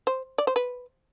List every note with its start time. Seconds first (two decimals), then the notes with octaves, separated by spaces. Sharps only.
0.07 C5
0.38 D5
0.47 C5
0.56 B4